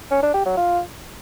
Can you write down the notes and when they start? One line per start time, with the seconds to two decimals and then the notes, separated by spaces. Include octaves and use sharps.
0.11 C#4
0.22 D4
0.34 G4
0.45 F#3
0.57 F4